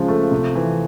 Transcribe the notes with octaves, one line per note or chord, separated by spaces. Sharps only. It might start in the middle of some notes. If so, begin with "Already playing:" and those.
Already playing: C#3 F3 G#3
A3
C3
E3